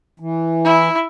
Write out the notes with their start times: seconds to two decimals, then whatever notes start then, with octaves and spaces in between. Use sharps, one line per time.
0.20 E3
0.64 E4